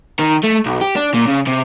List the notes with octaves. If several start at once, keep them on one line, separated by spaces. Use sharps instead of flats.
D#3
A3
B1
G4
D4
A#2
C#3
C3